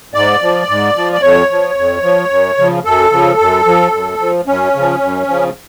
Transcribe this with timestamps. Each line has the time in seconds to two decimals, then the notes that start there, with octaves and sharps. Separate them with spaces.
0.14 G#2 D5
0.42 F3
0.69 G#2
0.95 F3
1.13 D5
1.22 F2 C#5
1.50 F3
1.77 F2
2.03 F3
2.30 F#2
2.58 C#3 F3
2.85 F#2 A4
3.12 C#3 F3
3.39 F#2
3.66 F3
3.92 F#2
4.20 F3
4.47 F#2 C#4
4.75 C#3 F3
5.01 F#2
5.28 C#3 F3